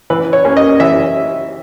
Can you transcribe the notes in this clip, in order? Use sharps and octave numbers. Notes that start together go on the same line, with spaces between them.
E3 B4
C#5
A#3 C#4
D#5
E3 E5